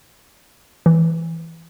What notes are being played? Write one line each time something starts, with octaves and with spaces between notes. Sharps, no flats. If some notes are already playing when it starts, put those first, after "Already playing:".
E3